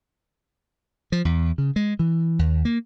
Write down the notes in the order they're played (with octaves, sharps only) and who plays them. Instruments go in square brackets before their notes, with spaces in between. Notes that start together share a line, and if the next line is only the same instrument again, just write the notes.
[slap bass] F3
E2
C#3
G#3
E3
D#2
A#3